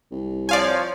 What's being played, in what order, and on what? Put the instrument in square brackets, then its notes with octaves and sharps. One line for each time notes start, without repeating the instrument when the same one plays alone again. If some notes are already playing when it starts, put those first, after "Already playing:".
[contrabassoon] C2
[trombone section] F3 [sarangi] C#5 [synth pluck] D5 F5 G#5